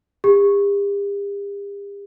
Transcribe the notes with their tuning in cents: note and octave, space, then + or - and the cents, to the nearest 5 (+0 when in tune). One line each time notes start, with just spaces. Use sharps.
G4 +45